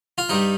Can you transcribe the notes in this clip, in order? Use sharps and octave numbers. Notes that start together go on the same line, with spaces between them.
F4
G2 G3 D#4